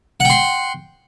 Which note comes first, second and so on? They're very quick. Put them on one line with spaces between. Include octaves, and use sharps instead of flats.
F#5 G5 C6